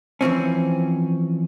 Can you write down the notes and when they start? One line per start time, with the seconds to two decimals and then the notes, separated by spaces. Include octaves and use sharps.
0.21 E3 F3 C4 C#4